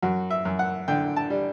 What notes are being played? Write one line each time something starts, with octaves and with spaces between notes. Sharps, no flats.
F#2 F#4
E5
F#2
F#5
D3 G5
A5
G3